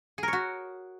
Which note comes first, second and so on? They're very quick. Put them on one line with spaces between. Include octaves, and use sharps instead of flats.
G#4 A#4 C#5 F#4